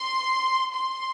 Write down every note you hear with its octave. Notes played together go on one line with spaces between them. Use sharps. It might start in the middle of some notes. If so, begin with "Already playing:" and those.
Already playing: C6
C6